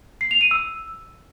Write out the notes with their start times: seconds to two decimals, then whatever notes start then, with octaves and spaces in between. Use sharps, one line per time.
0.21 C7
0.31 F7
0.41 D#7
0.51 E6